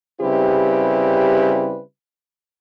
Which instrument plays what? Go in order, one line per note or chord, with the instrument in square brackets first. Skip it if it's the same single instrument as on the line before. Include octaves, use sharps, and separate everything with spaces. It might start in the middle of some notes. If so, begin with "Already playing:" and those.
[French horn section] C#3 G3 C4 E4 G4 B4